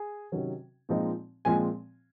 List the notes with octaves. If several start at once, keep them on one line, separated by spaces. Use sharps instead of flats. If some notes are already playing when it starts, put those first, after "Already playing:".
Already playing: G#4 G#5
C3 D#3 F#3 C#4
A#2 F3 G#3 C4 D#4
A#2 F3 G#3 C4 G#5